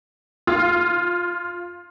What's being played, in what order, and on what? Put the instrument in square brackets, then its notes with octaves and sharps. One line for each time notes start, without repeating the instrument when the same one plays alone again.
[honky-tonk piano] F4